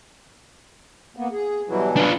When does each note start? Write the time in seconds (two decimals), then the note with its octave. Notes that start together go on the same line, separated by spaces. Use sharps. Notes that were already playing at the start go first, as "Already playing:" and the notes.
1.17 A#3 B3
1.31 G#4
1.69 B2 E3 F#3 G3 E4
1.96 D4 F4 B4